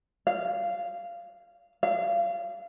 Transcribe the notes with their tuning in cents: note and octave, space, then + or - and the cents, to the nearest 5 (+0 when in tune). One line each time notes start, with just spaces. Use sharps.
F5 -15
F5 -30